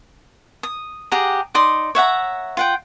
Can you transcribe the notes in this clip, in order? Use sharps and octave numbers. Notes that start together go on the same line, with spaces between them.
D#6
G4 G#4 F#5 A#5
D#4 D5 C6 D#6
C#5 E5 F#5 A#5
F4 F#5 G5